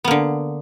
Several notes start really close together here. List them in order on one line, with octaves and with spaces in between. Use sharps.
B3 A#3 D3